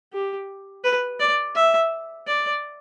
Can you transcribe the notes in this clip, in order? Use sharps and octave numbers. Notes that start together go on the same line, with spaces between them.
G4
B4
D5
E5
D5